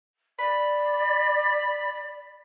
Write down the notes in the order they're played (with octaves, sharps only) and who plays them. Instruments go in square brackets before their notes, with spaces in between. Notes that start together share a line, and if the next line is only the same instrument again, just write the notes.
[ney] D5 [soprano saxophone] B5